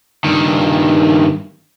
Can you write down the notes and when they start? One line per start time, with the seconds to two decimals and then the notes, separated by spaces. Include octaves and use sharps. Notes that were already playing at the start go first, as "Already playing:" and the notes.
0.24 G2 D#3